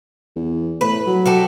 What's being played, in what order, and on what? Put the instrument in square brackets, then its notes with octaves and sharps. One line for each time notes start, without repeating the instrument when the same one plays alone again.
[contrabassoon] E2
[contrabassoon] A2 [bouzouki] B4
[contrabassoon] F#3
[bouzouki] F#4 G4 A4